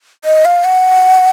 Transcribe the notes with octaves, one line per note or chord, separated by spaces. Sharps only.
D#5
F5
F#5